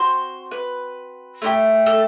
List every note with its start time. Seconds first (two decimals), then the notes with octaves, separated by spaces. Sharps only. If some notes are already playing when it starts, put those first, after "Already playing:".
Already playing: C4 F#4 C5
0.51 B4
1.42 A3 E4 G4
1.86 A4